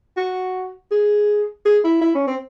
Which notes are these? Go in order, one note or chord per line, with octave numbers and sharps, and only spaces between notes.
F#4
G#4
G#4
E4
E4
C#4
C4